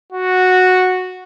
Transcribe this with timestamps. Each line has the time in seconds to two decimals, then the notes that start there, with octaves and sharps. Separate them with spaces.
0.13 F#4